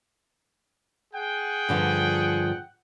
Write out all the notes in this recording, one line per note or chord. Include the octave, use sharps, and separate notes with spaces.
G#4 F#5 G5
G2 D3 F3